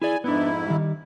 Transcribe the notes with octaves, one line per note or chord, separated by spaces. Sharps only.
E4 G#4 D5 G#5
F2 G#2 B3 D4 E4
D#3 G3